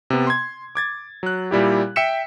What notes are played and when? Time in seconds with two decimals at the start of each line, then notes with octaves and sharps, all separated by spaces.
0.10 C3 B3
0.27 C6 G#6
0.75 D6 G#6 A6
1.23 F#3 F#6
1.51 A#2 G3 E4 G4
1.96 E5 G5 E6 B6 C#7 E7